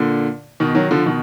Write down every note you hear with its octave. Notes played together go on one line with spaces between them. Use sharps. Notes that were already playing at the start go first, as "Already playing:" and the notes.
Already playing: A#2 D3
B2 D#3
D#3 F#3
D3 F3
B2 D#3